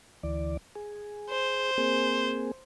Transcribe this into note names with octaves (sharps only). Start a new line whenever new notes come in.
D2 E3 D5
G#4
C5
A#3 C4 G#4